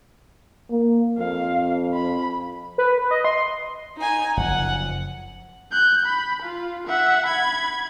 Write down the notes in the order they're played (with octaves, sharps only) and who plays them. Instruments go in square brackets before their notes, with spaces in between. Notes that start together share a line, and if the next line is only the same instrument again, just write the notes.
[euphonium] A#3
[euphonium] F2 [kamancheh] F5
[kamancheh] B5
[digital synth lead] B4
B4
D#5
C6
[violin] D#4 G#5
[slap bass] F#1 F#2 F3 [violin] F#5
[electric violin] F#6 G6
B5
F4
E5 F#5
B5 G#6